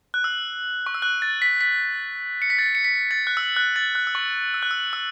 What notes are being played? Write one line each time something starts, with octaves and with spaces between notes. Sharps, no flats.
F#6
E6
C#6
E6
F#6
A6
B6
B6
C#7
B6
A6
C#7
B6
A6
F#6
E6
F#6
A6
F#6
E6
C#6
E6
F#6
E6
E6